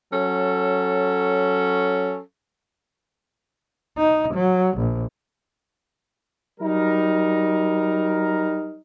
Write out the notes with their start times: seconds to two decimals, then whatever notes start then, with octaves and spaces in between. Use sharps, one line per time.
0.12 F#3 C#4 A4
3.98 D#4
4.34 F#3
4.78 A#1
6.60 F#3 G3 D#4 A#4